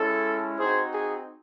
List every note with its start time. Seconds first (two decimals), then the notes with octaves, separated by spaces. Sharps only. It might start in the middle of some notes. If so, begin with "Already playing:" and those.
Already playing: G#3 C#4 E4 A4
0.59 C4 D#4 F#4 G#4 C5
0.94 G#4